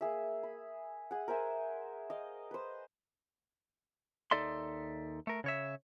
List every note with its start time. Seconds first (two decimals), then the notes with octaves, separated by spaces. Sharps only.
0.01 A#3 G#4 E5
0.43 B5
1.11 G#4 F#5
1.28 A#4 C5 E5 G#5
2.10 D#5 F5
2.51 B4 C5
4.31 D#2 D#4 A4 D5 E5 C6
5.27 A3 A#4
5.44 C#3 C#5 E5